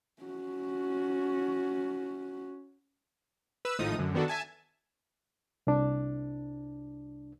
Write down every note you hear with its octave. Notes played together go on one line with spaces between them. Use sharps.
C#4 F#4
B4 E6
G#1 A2 F3 D#4 D#6
F#2 D3
D#3 B3 D4 F#4 A4
E5 G#5 A5
C2 D4